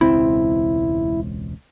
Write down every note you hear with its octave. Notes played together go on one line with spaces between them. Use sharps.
E1 C#2 C4 E4